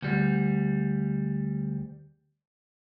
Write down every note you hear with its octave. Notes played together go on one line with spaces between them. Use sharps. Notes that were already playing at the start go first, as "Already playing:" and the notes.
D2 G3